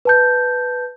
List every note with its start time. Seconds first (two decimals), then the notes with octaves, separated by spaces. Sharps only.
0.05 B4 A5 G6